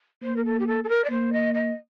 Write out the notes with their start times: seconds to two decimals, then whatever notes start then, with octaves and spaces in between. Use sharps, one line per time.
0.23 A#3 C5
0.36 A#4
0.45 A4
0.59 G4
0.67 A4
0.84 A4
0.89 A#4
1.04 D5
1.10 A#3 C5
1.33 D#5
1.54 D#5